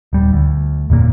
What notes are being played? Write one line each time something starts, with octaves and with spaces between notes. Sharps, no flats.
D#1 G3
D2
F#1 E2 A#2 A#3